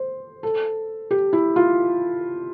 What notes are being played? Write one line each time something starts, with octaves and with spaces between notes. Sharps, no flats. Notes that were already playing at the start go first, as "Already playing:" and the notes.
Already playing: C5
A4
G4
E4
F4